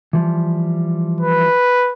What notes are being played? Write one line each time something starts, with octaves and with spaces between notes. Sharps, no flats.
E3 F3 G3
B4